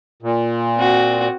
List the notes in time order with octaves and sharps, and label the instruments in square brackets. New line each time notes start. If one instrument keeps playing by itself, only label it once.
[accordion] A#2
[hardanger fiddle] C4 F#4